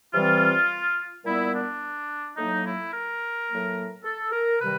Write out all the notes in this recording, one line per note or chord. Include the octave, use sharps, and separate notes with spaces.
C3 E3 G3 C4 F4
A#2 G3 B3 E4
D4
A2 F#3 A#3 D#4
E4
A#4
A2 F#3 A#3
A4
A#4
C3 D#3 G3 B4